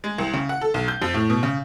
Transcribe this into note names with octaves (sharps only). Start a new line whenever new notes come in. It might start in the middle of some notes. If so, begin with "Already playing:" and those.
G#3
C2
C#3
F#5
A4
B1
G6
F2
A2
B2
C#3